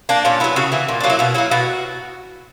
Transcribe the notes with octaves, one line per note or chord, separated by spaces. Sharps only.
A#3 D4
A#2 C#4
F#3 B3 E4
C#3 F#4
E3 A#3
A#2
F#3 A#3 D4
E4
B2 F#4
F#3 A#3 E4
B2 F#4